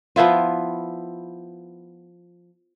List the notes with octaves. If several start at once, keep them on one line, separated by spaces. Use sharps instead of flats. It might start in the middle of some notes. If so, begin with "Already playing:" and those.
F3 B3 E4 F4